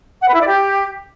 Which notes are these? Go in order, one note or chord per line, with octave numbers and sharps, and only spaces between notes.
F#5
B4
E4
D5
G4